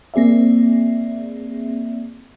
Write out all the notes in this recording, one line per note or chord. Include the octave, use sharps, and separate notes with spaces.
A#3 C4 G#4 D5 E5